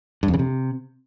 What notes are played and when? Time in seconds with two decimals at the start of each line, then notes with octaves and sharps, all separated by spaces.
0.23 G2
0.28 F2
0.34 C#3
0.39 C3